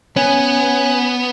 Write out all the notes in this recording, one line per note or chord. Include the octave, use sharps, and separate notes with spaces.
B3 C#4 G#5